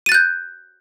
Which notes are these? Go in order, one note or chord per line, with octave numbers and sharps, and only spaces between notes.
F#6 G6 A6 D#7